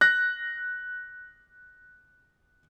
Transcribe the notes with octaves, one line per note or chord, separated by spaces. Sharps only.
F#6 A#6